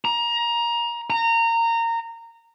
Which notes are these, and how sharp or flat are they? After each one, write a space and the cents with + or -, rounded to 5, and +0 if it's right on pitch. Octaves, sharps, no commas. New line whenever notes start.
A#5 +20
A#5 -20